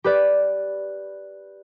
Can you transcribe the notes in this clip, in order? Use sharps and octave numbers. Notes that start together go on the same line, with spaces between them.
G4 B4 D5